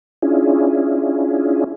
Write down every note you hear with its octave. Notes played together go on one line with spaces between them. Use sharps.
C#4 D4 E4 F4 G#4